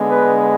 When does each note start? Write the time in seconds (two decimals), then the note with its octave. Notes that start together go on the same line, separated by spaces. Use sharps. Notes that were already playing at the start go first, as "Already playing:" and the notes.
Already playing: D3 G#3 B3
0.10 B4